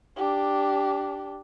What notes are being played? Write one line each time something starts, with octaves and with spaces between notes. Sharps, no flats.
D4 G4